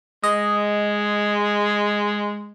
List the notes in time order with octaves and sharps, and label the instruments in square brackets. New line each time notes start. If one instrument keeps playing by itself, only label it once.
[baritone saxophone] G#3 [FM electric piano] D#5